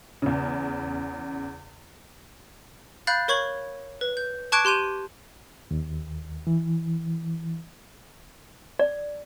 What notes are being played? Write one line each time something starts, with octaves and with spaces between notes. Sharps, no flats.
E2 C#3
F5 B5 F#6 G6 A6
A#4 C#5 C#6 G#6 F#7
B4
G6
A5 C#6 D6 F#6 G#6 D7
G4 C6 G6 D#7 F7
D#2
E3
D5